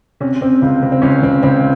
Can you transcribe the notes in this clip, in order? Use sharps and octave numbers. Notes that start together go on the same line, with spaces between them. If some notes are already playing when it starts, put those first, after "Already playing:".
C3 C#4
C3 C4
C#2
C3
C4
C#2 C#4
C#2 C4
C#2 C4